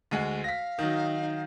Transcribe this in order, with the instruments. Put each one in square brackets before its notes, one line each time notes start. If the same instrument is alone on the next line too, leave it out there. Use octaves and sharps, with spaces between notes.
[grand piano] D2 G#3 F#5
[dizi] F5 [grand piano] A#6 B6
[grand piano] D#3 F#3 [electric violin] D#4